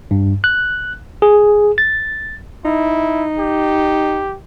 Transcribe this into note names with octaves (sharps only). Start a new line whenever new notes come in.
G2
F#6
G#4
A6
D#4 E4
G4